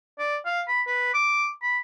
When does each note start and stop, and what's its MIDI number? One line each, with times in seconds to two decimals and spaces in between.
0.19 0.37 74
0.46 0.61 77
0.68 0.82 83
0.87 1.13 71
1.14 1.50 86
1.62 1.78 83